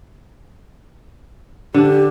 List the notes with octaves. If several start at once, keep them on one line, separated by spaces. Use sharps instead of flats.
D3 D4 G4